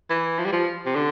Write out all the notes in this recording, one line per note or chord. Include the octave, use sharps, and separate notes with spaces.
E3
F3
G3
F3
C3
D3